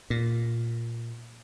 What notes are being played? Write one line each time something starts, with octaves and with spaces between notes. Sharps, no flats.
A#2